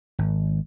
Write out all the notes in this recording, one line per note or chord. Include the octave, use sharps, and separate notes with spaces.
G#1